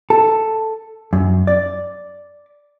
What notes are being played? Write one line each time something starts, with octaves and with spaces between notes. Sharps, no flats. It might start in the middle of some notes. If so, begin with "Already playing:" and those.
A4
F#2
D5